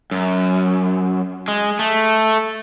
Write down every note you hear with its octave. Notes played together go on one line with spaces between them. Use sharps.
F#2
G#3
A3